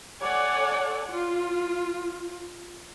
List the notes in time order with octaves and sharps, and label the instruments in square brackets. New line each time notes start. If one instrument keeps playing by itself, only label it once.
[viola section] A4 C#5 D5 F#5 G#5
F4